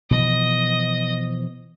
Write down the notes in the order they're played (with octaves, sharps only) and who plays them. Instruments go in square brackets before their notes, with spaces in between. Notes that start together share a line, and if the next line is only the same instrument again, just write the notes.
[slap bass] B2 E3 F3 [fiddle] D#5